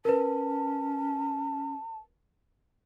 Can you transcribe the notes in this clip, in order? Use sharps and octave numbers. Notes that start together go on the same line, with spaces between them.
C#4 A#4 B4 A5